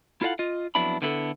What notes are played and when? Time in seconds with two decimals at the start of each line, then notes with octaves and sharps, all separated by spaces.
0.22 E4 F4 A4 D#5 F5 F#5
0.39 F4 D#5
0.75 F2 F#3 B3 D4 E4 B5
1.02 D3 B3 E4 G#4 A4